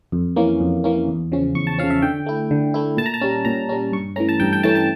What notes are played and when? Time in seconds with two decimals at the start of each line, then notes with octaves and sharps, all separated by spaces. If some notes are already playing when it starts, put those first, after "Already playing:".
0.12 F2
0.36 E3 A#3 C#4
0.61 F2
0.84 E3 A#3 C#4
1.08 E2
1.32 C#3 F3 C#4
1.55 E2 C#6
1.67 A5
1.79 C#3 F3 C#4 F5
1.90 E5
2.02 D3 G5
2.26 A3 E4
2.51 D3
2.74 A3 E4
2.97 A#2 A5
3.06 A#5
3.14 A5
3.21 G3 C#4
3.45 A#2 A#5
3.69 G3 C#4
3.92 G2 C#6
4.16 E3 A3 C#4 A#5
4.29 A5
4.40 G2 G5
4.53 G5
4.63 E3 A3 C#4 A5
4.75 A5